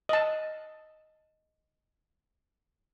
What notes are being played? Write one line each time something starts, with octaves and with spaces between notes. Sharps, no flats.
D#5 A5